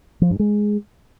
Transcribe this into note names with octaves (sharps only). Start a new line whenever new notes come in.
F3
G2
G#3